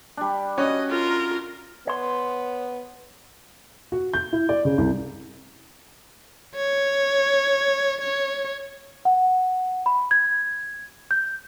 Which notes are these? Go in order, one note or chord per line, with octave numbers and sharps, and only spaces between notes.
G3 D4
C#4 F#4 D#5
F4 A#4
B3 C#5 C6
F#4
G6
E4
D5
C#3
C2
C#5
C#5
F#5
B5
G#6
G6